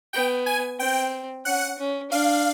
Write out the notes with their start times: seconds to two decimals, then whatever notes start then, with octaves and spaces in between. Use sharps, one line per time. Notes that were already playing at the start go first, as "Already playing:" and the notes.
0.13 B3 G5
0.46 G#5
0.79 C4 G5
1.45 C#4 F#5
1.78 C#4
2.11 D4 F5